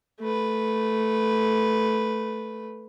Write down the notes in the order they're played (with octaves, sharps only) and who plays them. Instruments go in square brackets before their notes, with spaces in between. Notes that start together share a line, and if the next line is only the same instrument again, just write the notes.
[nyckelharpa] A3 B4